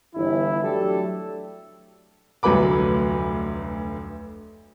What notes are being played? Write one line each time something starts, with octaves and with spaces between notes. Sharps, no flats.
G1 E3 E4
F#3 A3 D4 G4 A4
F1 D2 F#3 B4 B5 D6